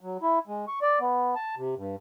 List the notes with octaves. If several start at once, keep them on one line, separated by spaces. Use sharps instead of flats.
F#3
E4
G#3
C#6
D5
B3
A5
C3
G2